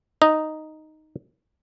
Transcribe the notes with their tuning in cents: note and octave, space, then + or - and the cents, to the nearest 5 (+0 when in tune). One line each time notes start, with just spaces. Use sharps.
D#4 +0 D#5 +0